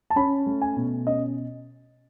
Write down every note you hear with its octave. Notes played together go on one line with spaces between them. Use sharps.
A5
C#4 B5
A3
G#5
B2
C#4 D#5